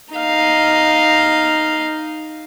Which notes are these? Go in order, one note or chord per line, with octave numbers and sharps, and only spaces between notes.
D#4 F5